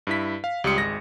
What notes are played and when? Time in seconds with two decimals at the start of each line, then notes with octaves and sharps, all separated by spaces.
0.07 G2 E4 B6
0.44 F5
0.64 C#2 G3 G4 C6 D#6 C#7
0.77 G#1 G#3 A#6